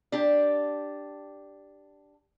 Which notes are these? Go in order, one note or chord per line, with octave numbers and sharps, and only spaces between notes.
D4 G4